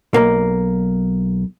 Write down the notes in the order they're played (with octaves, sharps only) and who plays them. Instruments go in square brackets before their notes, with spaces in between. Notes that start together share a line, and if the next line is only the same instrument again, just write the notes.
[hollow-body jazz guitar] B1 A#3